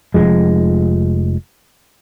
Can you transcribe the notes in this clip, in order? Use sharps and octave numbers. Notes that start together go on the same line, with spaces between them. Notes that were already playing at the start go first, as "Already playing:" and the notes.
F1 D#2 F3 G#3